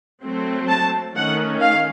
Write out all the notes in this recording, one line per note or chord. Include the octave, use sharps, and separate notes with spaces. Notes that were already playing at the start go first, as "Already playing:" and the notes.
F#3 A3 C4
A5
D#3 A3 C#4 F#5
F5